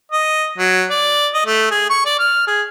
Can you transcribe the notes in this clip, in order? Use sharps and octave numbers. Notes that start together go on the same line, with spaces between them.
D#5
F#3
D5
D#5
A3
G#4
C#6
D5
F6
G#4